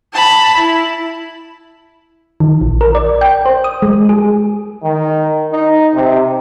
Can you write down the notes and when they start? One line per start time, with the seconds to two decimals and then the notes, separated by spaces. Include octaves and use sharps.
0.13 A5 B5
0.58 E4
2.40 D#3
2.61 A#1
2.81 A#4
2.95 D5
3.21 G5
3.46 C5
3.64 D#6
3.82 G#3
4.09 G#4
4.83 D#3
5.52 D#4
5.94 C3